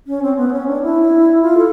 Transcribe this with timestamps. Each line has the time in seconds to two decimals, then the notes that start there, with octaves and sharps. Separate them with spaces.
0.07 C#4
0.22 C4
0.37 B3
0.48 C4
0.52 C#4
0.68 D4
0.83 E4
1.42 F4
1.57 A4